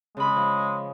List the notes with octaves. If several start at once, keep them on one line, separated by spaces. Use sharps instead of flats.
C#3 G#3 B5
F3